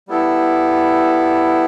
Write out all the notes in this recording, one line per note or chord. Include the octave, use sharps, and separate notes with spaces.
G3 B3 E4 A4